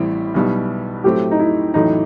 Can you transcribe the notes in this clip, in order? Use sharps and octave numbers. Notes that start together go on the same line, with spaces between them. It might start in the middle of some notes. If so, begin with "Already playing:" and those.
Already playing: A1 A2 G3 C4 E4
B1 B2 G3 B3 E4
A2 F#3 A3 C4 G4
D#4
E4
A1 A2 F#3 A3 D#4